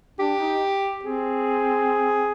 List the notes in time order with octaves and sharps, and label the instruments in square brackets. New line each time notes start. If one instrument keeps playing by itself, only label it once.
[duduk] D4 [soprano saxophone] G4
[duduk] D#4
[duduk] C4 [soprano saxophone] G#4